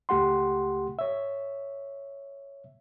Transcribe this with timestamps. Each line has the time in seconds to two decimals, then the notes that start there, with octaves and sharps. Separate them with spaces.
0.09 C#2 A3 G4 F#5 C6
0.99 C#5 E5